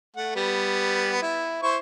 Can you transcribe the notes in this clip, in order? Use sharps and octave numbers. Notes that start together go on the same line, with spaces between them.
A3 F#5
G3 B3
E4
E4 C5 C#6